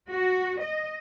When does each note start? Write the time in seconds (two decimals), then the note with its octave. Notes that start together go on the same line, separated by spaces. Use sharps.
0.11 F#4
0.60 D#5